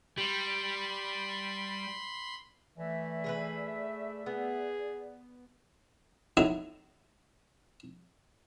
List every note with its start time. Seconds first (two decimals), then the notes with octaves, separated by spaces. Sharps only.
0.18 G3 B5 C6
2.78 E3 A3 D5 E5
3.24 G#4 A#4 B4
4.26 B3 G#4
6.37 F#3 D#4 E4 A4 D#5